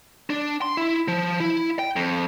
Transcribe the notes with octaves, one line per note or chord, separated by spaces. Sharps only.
D4
C6
E4
F3
E4
G5
F2